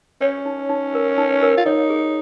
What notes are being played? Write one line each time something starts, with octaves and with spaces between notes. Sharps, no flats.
C#4 C#5
D#4
D#4
A#4
D#4
A#4
F4
D#4 C#5
G#4